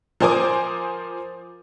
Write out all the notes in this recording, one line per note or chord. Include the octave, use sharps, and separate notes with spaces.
F3 A#4 C5 G#5 D6 D#6